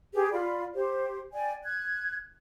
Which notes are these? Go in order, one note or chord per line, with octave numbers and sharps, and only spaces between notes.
G4 G#4 B4
F4 D5 B5
G4 C5
D5 G5 G#5
F#6 G#6